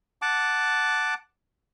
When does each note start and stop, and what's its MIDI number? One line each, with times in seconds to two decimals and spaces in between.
0.22 1.14 78
0.22 1.14 81
0.22 1.14 86